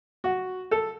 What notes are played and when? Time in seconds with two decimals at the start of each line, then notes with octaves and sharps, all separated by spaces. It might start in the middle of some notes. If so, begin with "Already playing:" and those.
0.24 F#4
0.71 A4